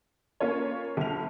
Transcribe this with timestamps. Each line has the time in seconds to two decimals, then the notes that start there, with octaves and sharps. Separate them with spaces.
0.40 A#3 C#4 F4 C#5
0.97 G1 F7